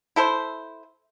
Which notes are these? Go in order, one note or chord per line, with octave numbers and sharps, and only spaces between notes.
E4 A4 C5